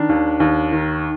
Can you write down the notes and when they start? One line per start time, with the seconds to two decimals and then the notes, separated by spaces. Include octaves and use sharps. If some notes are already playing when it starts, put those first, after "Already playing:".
Already playing: D#3 D4
0.09 D#2
0.40 D#2
0.72 D#3